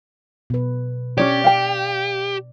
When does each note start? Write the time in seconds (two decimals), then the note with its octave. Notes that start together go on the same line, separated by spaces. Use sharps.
0.50 B2 B4
1.18 C#4 D4 G4 C#5 D5
1.44 F5 G5